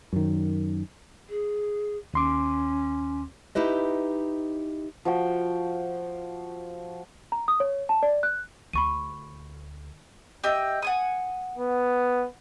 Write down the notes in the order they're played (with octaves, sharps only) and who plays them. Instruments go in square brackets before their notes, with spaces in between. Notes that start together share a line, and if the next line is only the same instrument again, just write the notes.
[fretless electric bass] F#2 D#3
[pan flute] G#4
[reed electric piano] D#2 C6 D6 [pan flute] C#4
[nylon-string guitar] D#4 E4 G4 B4 D#5
[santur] F3 F#4 G5
[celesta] A#5
D#6
C#5
A5
D5
F#6
[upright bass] D2 [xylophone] B5 C#6 D#7
[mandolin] G4 D#5 E5
F#5 G#5 D#6
[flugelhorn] B3